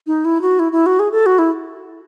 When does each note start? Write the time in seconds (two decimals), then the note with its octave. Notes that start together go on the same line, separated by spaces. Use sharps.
0.07 D#4
0.25 E4
0.42 F#4
0.59 E4
0.72 E4
0.86 F#4
0.99 G#4
1.12 A4
1.26 F#4
1.39 E4